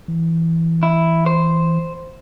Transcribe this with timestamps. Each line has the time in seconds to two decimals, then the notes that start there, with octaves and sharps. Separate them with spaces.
0.08 E3
0.83 E4
1.26 C5